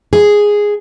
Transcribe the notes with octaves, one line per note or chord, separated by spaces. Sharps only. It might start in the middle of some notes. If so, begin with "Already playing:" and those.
G#4